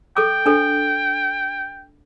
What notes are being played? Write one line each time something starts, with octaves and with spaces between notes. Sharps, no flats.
A4 G5 D6
D4 A4 C5